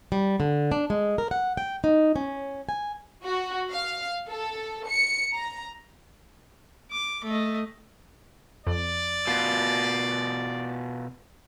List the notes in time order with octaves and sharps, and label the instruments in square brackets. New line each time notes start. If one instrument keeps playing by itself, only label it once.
[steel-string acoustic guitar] G3
D3
D4
G#3
A#4
F#5
G5
D#4
C#4
G#5
[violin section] F#4
F5
A4
C#7
A#5
[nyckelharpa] D6
A3 D#5
[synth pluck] F2 [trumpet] D5
[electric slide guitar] B2 F4